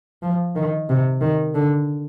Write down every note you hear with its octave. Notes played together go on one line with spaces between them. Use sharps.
F3
D#3
C3
D#3
D3